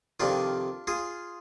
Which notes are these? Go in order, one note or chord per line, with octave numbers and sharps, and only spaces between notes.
F2 C3 D#3 D4 F4
F4 G#4